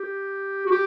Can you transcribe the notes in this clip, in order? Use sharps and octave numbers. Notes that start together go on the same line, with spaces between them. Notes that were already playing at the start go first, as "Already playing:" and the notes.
Already playing: G4
F#4
G4